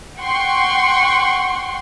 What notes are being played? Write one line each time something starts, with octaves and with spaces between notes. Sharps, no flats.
F#5 G5 C6 C#6